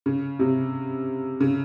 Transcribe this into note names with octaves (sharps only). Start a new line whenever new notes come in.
C#3
C3
C#3